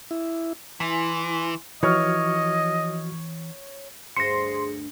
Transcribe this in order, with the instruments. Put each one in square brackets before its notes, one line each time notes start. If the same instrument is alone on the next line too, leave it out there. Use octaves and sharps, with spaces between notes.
[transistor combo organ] E4
[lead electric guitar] E3 [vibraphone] E4 G#5 C6
[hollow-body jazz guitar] E3 [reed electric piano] F3 F#4 F6 [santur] C#5 [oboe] D#5
[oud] D2 G2 C5 [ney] G#4 [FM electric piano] C6 [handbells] A#6 C#7